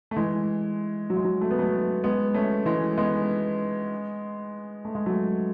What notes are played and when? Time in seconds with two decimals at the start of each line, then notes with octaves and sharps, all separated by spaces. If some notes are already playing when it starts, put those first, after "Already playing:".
0.11 A3
0.16 E3 G#3
1.10 F#3
1.17 G#3
1.25 F#3
1.41 A3
1.51 B3
1.59 F#3 A3
2.04 G#3 B3
2.34 A3 C#4
2.65 E3 G#3
2.98 G#3 B3
4.85 A3
4.95 G#3
5.06 F#3 A3